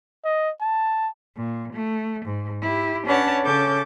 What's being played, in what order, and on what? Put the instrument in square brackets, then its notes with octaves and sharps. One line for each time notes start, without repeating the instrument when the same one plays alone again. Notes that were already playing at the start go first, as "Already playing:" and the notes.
[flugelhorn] D#5
A5
[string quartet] A#2
A3
G#2
E4 G4
C#4 D4 B4 C#5 F#5 A5
C#3 C#4 A4 D6 G6 A6